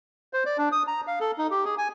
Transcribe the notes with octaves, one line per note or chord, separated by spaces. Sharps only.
C5
D5
D4
D#6
A#5
F5
A4
D#4
G4
G#4
G#5